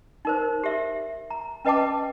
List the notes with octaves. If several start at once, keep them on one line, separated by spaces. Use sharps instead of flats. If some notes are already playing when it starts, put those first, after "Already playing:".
D#4 A#4 C5
G4 E5
A#5
C#4 B4 D#5 G5 A5 D6